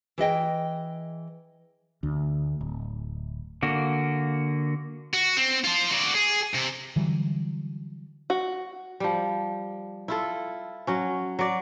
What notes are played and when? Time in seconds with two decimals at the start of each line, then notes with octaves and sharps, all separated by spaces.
0.18 E3 G#4 D#5 G5
2.03 D2
2.61 D1
3.63 D3 A#3 F#4
5.13 F#4
5.37 C4
5.64 F4 C5
5.91 F#4 D5
6.14 G#4
6.54 C3
6.96 D3 E3 F#3 G3
8.30 F#4
9.00 F3 G3
10.08 E4 F4 A4
10.87 F#3 C#4
11.39 F#3 D5